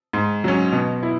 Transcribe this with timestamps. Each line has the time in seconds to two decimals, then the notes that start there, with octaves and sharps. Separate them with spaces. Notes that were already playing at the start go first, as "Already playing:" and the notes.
0.13 G#2
0.44 F#3 C#4
0.72 B2
1.03 E4